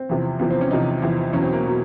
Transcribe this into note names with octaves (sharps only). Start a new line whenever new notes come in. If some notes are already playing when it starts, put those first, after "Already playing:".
Already playing: C4
E2 C3 F3
E2 C3 F3 B3
C4
C#4
E2 C3 F3 D#4
E2 C3 F3
E2 B2 F#3 C#4
C4
A#3
B2 F#3